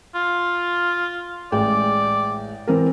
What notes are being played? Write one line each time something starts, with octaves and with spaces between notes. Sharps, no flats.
F4
A1 G#3 D5 G5
E3 C4 A#4